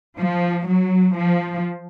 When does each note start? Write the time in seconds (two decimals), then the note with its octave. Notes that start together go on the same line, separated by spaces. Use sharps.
0.20 F3
0.68 F#3
1.17 F3